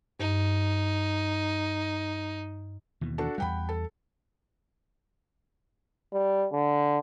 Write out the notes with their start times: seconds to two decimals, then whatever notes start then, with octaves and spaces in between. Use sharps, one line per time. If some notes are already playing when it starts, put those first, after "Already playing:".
0.20 G2 D#4
3.01 D#2 B2 E3
3.18 D4 F#4 A4
3.38 E2 G3 F#5 G5 B5
3.69 A4
6.13 G3
6.52 D3